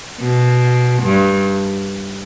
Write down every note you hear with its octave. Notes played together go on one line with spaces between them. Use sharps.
B2
G2